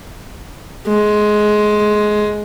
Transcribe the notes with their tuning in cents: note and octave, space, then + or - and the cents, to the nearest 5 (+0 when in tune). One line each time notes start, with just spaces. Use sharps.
G#3 +15